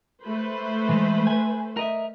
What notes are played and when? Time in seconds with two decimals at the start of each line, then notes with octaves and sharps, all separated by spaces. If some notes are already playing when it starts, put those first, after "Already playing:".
0.25 A3 B4 C5
0.89 E3 G#3
1.27 G#5
1.77 A#4 D#5 E5